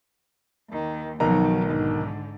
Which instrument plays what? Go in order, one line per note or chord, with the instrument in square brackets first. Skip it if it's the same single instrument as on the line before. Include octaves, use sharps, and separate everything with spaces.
[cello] D#2 D#3
[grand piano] B1 D#3 A#5 [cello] F3 F#3
[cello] G#2 D3